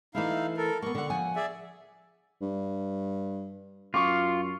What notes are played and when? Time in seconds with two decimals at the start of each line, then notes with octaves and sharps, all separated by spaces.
0.15 E3 A3 D#4 E4 F5
0.57 A4 A#4
0.82 A#3 B3 C#6
0.95 D3 F#5
1.10 F3 F#5 G#5
1.36 G#4 D5 E5
2.42 G2
3.94 F#2 F4 C#6 D6